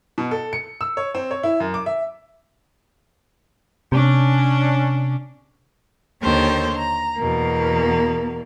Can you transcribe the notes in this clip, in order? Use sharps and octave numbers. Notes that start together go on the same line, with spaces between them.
B2
A4
C#7
E6
C#5
C4
C#5
E4
F#2
D6
E5
C3 C#4 D4
D#2 D3 C5 C#5 G5
A#5
E2 B2 A#3